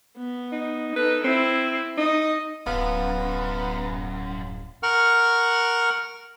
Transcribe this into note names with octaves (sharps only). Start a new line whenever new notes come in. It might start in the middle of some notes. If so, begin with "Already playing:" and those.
B3
D#4
D#4 A4 B4
C4 E4
D#4 D#5
D1 F#2 B3 F5
A#4 F#5 C#6 F6